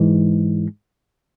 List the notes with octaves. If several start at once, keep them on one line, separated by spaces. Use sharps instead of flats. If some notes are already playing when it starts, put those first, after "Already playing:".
Already playing: G#2 E3 G#3